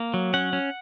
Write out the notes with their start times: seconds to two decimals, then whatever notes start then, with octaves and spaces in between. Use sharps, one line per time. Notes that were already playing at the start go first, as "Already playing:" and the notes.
Already playing: A#3
0.14 F#3
0.34 C#4 F#5
0.53 C#4